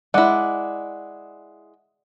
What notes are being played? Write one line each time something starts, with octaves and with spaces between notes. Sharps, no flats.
G#3 E4 D5 F#5